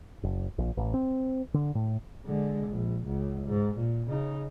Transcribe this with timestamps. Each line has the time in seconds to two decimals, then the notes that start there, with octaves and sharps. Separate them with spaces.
0.23 F#1
0.58 A#1
0.77 A1
0.94 C4
1.54 D3
1.75 A2
2.26 D3 G#3
2.68 A#1
3.06 C#2
3.47 G#2
3.77 A#2
4.09 C#3 D#4